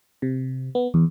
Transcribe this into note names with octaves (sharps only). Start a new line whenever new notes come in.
C3
B3
E2